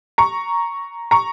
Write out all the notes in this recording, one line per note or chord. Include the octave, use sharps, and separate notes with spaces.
A#5 C#6
A#5 C#6